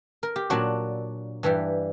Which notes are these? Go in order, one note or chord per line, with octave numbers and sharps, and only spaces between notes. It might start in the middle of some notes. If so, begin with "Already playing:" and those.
A#4
G4
A#2 F#3 D4 F#4
G2 E3 G3